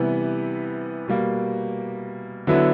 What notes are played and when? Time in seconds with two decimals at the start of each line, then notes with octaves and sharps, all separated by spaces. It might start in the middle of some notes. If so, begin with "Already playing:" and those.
Already playing: C3 E3 G3 B3
1.08 B2 G3 A#3
2.47 D3 F#3 B3 E4